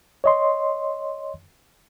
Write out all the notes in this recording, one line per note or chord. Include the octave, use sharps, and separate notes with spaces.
C#5 D#5 C6